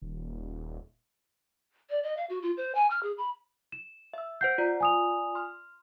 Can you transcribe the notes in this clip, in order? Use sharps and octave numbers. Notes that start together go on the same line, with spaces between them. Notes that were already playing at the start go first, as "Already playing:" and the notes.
D#1
D5
D#5
F5
F#4
F4
C5
G#5
F6
G#4
B5
E7
E5 E6
C5 F#5 G6 C7
F4 D5 A#5
G#5 D#6 F7
C6 F6